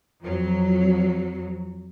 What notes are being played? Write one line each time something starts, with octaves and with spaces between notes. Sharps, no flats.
F2 F#3